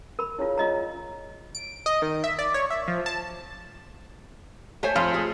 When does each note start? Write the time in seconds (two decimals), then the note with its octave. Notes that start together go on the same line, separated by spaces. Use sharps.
0.19 A#4 B5
0.39 C#3 E4 F4
0.58 F4 D#5 A#5
1.55 D7
1.86 D#5
2.02 D#3
2.24 E5
2.39 D5
2.54 C#5
2.70 E5
2.88 F3
3.06 A5
4.83 A3 C5 C#5 G#5
4.96 F2 F4
5.14 G#4